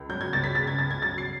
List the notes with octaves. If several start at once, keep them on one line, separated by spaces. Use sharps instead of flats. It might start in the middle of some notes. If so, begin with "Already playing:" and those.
Already playing: C#2
F#3 G6
G#6
C#2 A6
B6
C#3 A6
G#6
C#2 A6
G#6
F#3 A6
C7